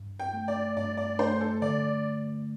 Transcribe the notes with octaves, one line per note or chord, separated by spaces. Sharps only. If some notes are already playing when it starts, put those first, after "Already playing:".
Already playing: G2
G5
A3
D5
G2 D5
D5
A3 C5
A4
D3 D5